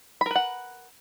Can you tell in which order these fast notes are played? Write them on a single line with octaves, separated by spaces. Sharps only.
B5 A#4 B4 F#5